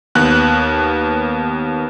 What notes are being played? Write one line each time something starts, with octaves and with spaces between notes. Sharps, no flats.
D#2 B3 F#6